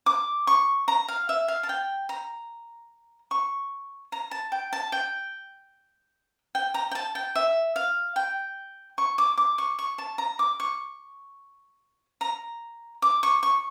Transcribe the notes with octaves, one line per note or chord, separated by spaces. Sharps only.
D6
C#6
A#5
F5
E5
F5
A5
G5
A#5
C#6
A#5
A5
G5
A5
G5
G5
A#5
G5
A5
G5
E5
F5
G5
C#6
D6
D6
C#6
C#6
A5
A#5
D6
C#6
A#5
D6
C#6
C#6